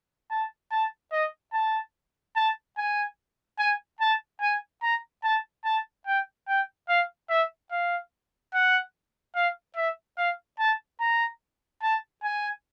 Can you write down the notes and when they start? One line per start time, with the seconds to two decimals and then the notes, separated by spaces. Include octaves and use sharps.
0.31 A5
0.71 A5
1.12 D#5
1.53 A5
2.36 A5
2.78 G#5
3.59 G#5
4.01 A5
4.41 G#5
4.83 A#5
5.24 A5
5.65 A5
6.07 G5
6.48 G5
6.89 F5
7.30 E5
7.71 F5
8.54 F#5
9.36 F5
9.76 E5
10.18 F5
10.59 A5
11.01 A#5
11.83 A5
12.23 G#5